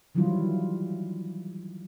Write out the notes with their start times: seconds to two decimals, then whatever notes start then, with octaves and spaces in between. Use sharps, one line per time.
0.15 D#3 E3 F#3 G3 E4 F4